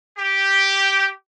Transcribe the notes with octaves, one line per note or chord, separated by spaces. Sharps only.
G4